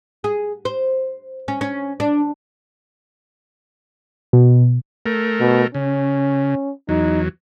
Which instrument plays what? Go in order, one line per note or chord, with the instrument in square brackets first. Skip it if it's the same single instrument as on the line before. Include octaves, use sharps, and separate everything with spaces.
[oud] G#4
C5
C#4
C#4
D4
[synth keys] B2
[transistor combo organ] A3 A#4
[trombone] B2
[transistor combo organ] C#3 [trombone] C#4
[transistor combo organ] E2 F#3 [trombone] D#4